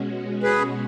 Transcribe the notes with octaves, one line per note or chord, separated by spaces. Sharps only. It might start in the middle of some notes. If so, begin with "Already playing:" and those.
Already playing: B2 G#3 C#4 F#4
G#4 B4